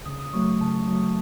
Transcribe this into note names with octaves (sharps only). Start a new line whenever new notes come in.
C#3 D#6
D#6
F#3 A3 C#6
C#3 A5
F#3 A3